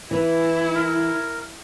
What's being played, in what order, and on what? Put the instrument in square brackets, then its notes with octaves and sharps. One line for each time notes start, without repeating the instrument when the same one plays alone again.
[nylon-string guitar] E3 B4 [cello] E4
[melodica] A#4